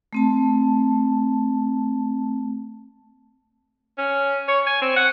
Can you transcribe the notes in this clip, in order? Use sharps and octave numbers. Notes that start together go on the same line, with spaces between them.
A3 C4 A5
C#4
C#5
G#5
C4
F#5